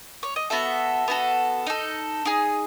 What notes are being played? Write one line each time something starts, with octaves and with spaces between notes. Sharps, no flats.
C#5
D#5
B3 F#4 A4 E5
B3 F#4 A4
D#4 A4
D#4 G#4